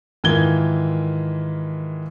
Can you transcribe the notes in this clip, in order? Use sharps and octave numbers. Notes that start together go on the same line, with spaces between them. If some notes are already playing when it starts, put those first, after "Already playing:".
G#2 D#3 E3 F4 G#6 G7